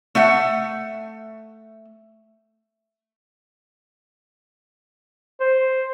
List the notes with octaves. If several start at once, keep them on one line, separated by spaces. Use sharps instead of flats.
A3 E5 F#5
C5